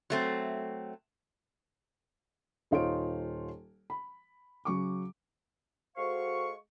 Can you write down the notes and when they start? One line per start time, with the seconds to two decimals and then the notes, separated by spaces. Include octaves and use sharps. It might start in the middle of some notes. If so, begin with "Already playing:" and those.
0.10 F#3 A3 C4
2.71 D#1 D#4 F4 C5 C#5 D7
3.90 B5
4.65 C#3 F#3 C#6 D6
5.97 G#3 F#4 A4 C5 F5 C#6